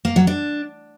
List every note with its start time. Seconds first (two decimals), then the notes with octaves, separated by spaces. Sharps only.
0.05 A#3
0.16 F#3
0.27 D4